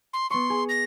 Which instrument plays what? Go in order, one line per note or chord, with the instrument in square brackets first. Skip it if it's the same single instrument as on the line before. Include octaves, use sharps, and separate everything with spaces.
[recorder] C6
[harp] B3 C#6 [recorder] C6
[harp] G#4
[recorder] A#6